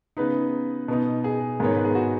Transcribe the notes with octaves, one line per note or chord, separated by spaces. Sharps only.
C#3 B3 D#4 B4
B2 B3 D#4
G#4
G#2 D#3 B3 D#4 C#5
B4
G#4
F#4